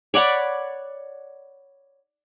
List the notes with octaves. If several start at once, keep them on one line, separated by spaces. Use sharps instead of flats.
C#5 D5 F#5 B5